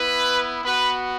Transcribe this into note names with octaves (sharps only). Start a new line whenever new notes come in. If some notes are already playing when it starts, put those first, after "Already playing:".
Already playing: B3 E4 B4
B3 F#4 B4